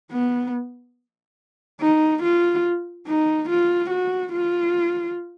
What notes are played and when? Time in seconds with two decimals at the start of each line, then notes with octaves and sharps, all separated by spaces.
0.12 B3
1.81 D#4
2.22 F4
3.07 D#4
3.49 F4
3.90 F#4
4.32 F4